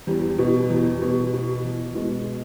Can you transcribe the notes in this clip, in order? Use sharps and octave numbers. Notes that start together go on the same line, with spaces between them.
E2 G3
B2
E2
B2
B2
E2
B2 G#3